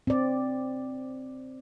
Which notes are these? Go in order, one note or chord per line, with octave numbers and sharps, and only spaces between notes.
C4 D5